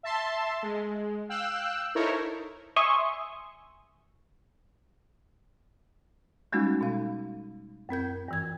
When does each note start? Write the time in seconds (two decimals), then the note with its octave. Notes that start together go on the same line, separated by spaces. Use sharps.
0.03 E5 A5 C6
0.63 G#3
1.29 F5 G5 E6 F#6
1.95 D#4 E4 A4 A#4 C5 C#5
2.76 E5 G#5 C6 C#6 D#6
6.52 G3 G#3 A#3 C#4 D#4 F#4
6.81 B2 F5
7.89 F#2 C4 A#4 G6
8.28 G2 E3 G#6